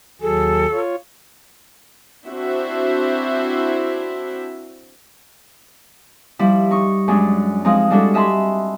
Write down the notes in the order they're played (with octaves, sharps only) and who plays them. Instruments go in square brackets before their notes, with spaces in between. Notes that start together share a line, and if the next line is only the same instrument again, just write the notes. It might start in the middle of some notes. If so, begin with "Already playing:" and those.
[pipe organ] D#2 F#3 G#4 [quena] A4
[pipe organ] F4 C#5
[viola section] C4 D4 E4 F#4 C5 E5
[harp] F3 G3 E4
D#4 C#6
F#2 G#3 D4
F3 G#3 C4 D#4
G3 G#3 D4 E4 F#4 A4
D#5 E5 G#5 A5 B5 C6